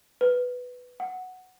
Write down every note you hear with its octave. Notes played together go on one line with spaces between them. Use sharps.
B4
F#5